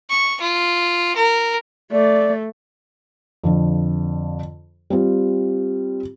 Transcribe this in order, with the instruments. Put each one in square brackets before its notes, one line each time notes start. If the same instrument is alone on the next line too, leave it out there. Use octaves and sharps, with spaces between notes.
[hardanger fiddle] C#6
F4
A#4
[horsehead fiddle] A3 [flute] D5
[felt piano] F2 D3 F3
G3 C4 F4